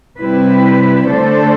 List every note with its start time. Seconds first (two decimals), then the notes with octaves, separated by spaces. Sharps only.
0.19 C3 G3 C4 E4 B4
1.06 D3 A3 D4 A4 C5